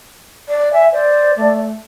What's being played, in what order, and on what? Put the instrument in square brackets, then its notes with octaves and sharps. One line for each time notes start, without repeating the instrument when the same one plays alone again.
[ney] D5
[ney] E5 [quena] G#5
[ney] C5 [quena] D5
[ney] A3